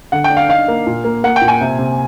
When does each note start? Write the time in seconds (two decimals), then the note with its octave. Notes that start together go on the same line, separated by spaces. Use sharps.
0.12 D3 F#5
0.24 G5
0.30 D4
0.37 F5
0.49 D#4 F5
0.68 A#3
0.87 A#2
1.05 A#3
1.24 A#3 F#5
1.36 G5
1.41 A#2
1.48 G#5
1.61 C3
1.79 C3